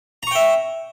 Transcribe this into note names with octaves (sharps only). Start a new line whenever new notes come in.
E5 G5 A#5 C#6